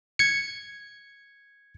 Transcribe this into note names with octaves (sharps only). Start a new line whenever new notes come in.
G#6 C#7